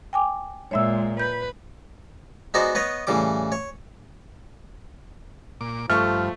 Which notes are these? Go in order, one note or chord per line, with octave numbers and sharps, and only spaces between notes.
G5 G#5 D6
A#2 G#3 C#5 E5 E6
B4 G6
G#3 B3 D#4 F#4 C5 D5
B3 B4 C#5 D#5
A2 C#3 E3 G3 D6
C#5
A#2 D6
G2 F3 A3 C#6 F6